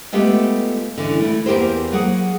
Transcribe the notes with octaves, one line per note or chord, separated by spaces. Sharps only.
G#3 A3 B3 F4 G4 A4
D3 E3 C#4
A3 E4
E2 C3 A#3 G4 A#4 C5
F#3 A#3 G#4 F#5